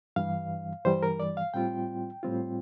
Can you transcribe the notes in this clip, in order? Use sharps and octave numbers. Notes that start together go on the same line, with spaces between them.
G2 E3 G3 F5
G2 E3 G3 C5
A#4
D5
F5
A2 G3 C4 F4 G5
A2 G3 C4 F4